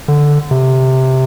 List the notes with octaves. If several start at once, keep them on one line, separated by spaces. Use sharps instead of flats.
D3
C3